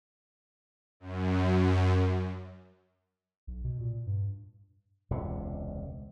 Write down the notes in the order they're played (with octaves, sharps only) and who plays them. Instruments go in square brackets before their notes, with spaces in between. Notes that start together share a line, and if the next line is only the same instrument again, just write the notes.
[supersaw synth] F#2
[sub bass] B1
B2
A#2
G2
[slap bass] E1 C#2 C3